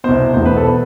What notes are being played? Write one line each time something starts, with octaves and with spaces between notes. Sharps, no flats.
C2 B2 C5
E1 E2 B2 C5
B4
A4
B2 B4